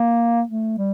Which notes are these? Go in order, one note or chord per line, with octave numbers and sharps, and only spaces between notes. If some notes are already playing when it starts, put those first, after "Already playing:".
Already playing: A#3
A3
G3